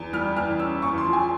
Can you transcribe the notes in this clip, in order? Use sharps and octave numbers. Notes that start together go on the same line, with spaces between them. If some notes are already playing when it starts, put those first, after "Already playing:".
Already playing: E2
G3 F6
E2 F6
C#4 E6
E2 C#6
C6
F3
G#5